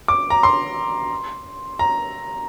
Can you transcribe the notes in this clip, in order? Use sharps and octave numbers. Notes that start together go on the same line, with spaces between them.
D6
A#5
C6
A#5